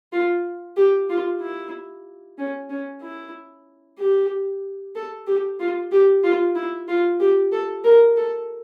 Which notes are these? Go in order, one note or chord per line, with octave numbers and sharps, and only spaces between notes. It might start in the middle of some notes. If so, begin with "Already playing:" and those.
F4
G4
F4
E4
C#4
C#4
E4
G4
A4
G4
F4
G4
F4
E4
F4
G4
A4
A#4
A4